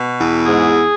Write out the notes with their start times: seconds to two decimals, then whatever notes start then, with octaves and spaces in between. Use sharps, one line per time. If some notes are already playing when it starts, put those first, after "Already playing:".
Already playing: B2
0.18 E2
0.47 G#2 G#4